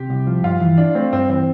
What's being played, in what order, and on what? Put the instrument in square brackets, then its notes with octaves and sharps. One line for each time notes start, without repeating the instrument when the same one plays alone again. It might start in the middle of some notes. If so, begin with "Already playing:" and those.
Already playing: [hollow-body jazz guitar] C3 [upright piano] G4
[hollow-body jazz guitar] C2
F3
[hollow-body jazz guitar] G2 [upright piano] F4
[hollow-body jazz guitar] E3
[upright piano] D4 [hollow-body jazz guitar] E4
[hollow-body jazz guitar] A3 [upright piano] C4
[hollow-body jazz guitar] G2 [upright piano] C4
[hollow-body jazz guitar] E3 [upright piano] C4